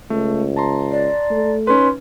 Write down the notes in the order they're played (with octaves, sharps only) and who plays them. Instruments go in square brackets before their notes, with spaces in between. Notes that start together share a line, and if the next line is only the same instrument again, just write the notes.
[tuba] C#2 [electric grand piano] A3
[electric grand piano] A5 A#5 C6
[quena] D5
[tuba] A3
[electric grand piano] C#4 D#4 B4 [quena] C6